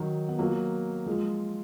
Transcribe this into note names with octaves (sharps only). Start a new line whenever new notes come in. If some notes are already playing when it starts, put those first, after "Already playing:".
Already playing: D#3 F#3
B3
F#3 A#3
F3 G#3